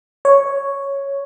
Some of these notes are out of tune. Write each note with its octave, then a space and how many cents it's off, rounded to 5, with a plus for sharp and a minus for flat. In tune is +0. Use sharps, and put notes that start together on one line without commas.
C#5 +0